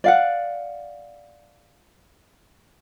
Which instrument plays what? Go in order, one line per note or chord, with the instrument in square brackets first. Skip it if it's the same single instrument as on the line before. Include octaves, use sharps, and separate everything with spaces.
[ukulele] D5 F5 F#5